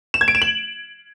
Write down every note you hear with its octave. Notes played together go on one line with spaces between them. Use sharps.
E7
G#6
D7
E7
F#7